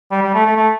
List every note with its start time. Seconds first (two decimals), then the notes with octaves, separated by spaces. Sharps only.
0.11 G3
0.22 G3
0.34 A3
0.45 A3
0.57 A3